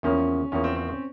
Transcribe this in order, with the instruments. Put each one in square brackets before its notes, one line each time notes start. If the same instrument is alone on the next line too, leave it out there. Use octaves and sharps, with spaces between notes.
[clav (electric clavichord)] E2 C#3 F3 A#3 [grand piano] C#4
[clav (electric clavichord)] E2 C#3 F3 A#3 [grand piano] C#4
[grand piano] C4
C4
C4